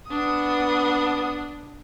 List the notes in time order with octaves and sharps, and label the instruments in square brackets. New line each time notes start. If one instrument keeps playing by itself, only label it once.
[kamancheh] B3 D#6 [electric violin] D4